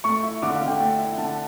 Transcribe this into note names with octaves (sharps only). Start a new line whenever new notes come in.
A3 C#6
E4
D3 D6
F5
D3
G5
A3
E4
D3 A5